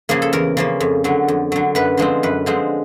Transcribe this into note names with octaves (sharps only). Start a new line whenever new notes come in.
C#3 F3 A#3 G#4
A4
E2 A#4
C#3 F3 A#3
F2
D3 F#3
F2
D3 F#3
F#2 B4
D3 F3 G#3 C4
F#2 B4
D3 F3 G#3 C4